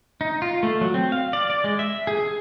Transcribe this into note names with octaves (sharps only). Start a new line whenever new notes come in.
D#4
F4
A3
F#3
C4
F5
D5
D5
G#3
E5
G#4
G#4